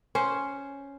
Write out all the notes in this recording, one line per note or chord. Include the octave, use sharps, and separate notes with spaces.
C#4 C5